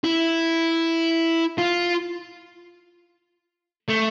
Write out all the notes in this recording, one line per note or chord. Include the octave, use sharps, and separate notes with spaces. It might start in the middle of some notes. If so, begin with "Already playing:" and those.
E4
F4
A3